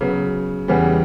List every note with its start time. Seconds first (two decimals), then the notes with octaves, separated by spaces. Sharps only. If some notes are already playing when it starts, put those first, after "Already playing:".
0.01 C#3 F#3 B3
0.68 E2 C#3 E3 G3 B3